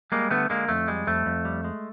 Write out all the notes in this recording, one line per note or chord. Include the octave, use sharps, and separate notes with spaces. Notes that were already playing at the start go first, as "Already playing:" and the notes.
G3 G#3 A#3
D3 A3 B3
D3 G#3 A#3
F2 A3
G3 G#3
F2 A3
F2
G3
G#3